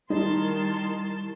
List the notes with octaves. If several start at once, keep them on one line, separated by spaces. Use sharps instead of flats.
D#3 G3 D#4 E4 A5 C6